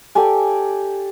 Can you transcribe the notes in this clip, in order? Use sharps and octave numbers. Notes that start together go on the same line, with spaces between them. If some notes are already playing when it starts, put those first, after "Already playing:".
G4 A4 D5 G#5